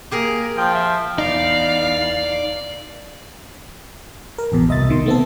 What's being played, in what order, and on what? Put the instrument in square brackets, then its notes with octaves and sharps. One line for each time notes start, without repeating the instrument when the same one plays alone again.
[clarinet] A#3 [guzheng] G4 G#4 A#4
[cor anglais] F3 [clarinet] G5
[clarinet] E5
[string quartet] E2 F5 [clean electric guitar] D#4 [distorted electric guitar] D5
[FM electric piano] A#4
A1 E2 B2
C2 D#5 E5 A6
B2 D#3 C6
A3 B3 C4 A4